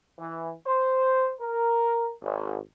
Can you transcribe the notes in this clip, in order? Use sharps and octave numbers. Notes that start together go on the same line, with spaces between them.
E3
C5
A#4
G#1